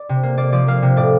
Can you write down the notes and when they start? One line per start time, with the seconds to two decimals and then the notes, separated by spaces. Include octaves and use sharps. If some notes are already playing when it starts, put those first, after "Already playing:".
Already playing: D5
0.09 C3
0.23 A#3
0.38 A#3 D5
0.52 F3 D5
0.68 A#3 F5
0.82 C3
0.97 A2 D5